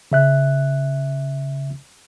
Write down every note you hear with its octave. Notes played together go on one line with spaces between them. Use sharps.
C#3 E5 F#6